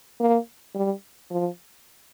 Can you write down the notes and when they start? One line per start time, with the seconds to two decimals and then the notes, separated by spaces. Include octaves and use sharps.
0.20 A#3
0.75 G3
1.31 F3